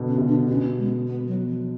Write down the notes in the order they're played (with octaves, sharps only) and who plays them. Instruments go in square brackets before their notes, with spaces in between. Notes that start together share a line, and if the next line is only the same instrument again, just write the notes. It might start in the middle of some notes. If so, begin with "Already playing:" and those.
Already playing: [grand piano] B2 D3
[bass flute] C#4
[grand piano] B2
[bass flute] D4
[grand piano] B2 [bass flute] C#4
[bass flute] G#3
B3
F#3
F3